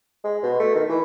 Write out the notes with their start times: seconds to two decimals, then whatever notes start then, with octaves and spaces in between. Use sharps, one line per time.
0.25 G#3
0.43 B2
0.60 A3
0.75 D#3
0.89 E3